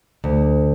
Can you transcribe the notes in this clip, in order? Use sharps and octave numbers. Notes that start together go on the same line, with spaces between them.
D2